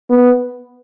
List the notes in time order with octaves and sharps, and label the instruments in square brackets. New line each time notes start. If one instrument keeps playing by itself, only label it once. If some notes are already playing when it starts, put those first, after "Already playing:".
[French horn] B3